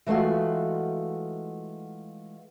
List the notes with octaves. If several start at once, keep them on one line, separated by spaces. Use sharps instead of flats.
E3 G#3 A3 F4 F#4